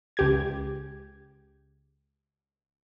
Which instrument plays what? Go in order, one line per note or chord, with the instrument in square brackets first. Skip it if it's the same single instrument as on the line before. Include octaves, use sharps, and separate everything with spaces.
[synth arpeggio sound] C#2 G4 G#6